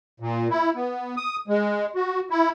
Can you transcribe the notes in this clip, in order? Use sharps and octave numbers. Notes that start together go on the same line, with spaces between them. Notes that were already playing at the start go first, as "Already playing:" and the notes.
A#2
E4
B3
D#6
G#3
F#4
E4